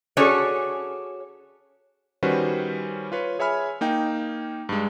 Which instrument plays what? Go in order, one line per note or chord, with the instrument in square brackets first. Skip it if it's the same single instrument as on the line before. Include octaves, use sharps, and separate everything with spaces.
[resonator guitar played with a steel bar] C#4 F#4 G#4 A4 C#5 D5
[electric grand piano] D#3 G3 C#4 F#4 B4 C5
F4 B4 C#5
G#4 C#5 E5 G#5 B5 F6
A#3 D#4 G5
G2 G#3